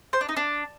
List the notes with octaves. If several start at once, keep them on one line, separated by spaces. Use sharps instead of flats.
C5
D4
D#4
D4